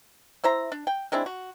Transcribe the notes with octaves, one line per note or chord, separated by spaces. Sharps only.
E4 C5 E5 A#5
D4
G5
G#3 C4 D4 E4
F#4